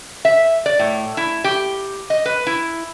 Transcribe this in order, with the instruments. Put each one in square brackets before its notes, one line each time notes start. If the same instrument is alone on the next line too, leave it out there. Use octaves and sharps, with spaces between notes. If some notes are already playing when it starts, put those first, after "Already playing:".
[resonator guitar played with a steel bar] E5
D5
A2
E4
G4
D#5
B4
E4